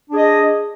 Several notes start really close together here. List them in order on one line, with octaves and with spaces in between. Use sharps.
D4 G#4 D#5